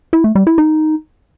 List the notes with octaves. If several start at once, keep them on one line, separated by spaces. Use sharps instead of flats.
E4
A3
G3
E4
D#4